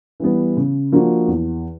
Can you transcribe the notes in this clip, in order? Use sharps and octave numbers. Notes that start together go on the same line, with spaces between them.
E3 G3 B3
C#3
F3 A#3 D4 F#4
E2